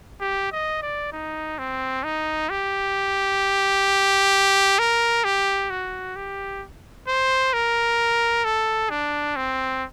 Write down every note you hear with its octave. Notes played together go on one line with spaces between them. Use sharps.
G4
D#5
D5
D#4
C4
D#4
G4
A#4
G4
F#4
G4
C5
A#4
A4
D4
C4